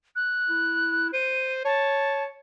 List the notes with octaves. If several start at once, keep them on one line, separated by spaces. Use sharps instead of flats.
F#6
E4
C5 D#7
C#5 A5